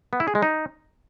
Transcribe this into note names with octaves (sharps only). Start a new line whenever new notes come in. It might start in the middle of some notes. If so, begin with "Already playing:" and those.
B3
E4
G#4
G#3
D#4